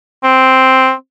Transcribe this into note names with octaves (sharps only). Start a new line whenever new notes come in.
C4